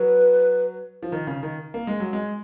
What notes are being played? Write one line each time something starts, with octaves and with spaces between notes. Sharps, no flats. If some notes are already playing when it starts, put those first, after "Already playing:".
Already playing: F#3 B4
F3
D#3
C#3
D#3
A#3
G#3
F#3
G#3